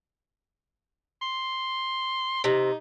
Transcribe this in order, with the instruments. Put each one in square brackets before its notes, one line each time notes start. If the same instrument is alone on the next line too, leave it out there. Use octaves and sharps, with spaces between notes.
[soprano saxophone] C6
[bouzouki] C3 [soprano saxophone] D#4